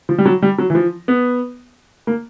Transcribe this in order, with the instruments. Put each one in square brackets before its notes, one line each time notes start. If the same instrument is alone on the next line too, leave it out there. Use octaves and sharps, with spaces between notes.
[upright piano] F3
G3
F#3
G3
F#3
E3
F3
B3
A#3